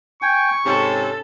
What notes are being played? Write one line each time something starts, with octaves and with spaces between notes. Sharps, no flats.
G5 G#5 C#6
G#2 C3 C#4 A4